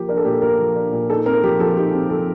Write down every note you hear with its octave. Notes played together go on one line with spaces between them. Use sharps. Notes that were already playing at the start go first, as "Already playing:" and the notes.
Already playing: F3 A#3 G4
D4 A#4
A4
A#2 G4
A4
A#3 A#4
F3
D4
A#2
D#4 A4
C4 A#4
F3 G4
F3 A4
D#4 G4
C4
F3 A4